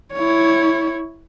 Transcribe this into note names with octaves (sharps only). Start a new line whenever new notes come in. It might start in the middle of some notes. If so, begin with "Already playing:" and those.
E4 C#5